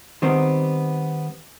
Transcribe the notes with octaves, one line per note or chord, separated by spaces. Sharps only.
D#3 G3 B3 C4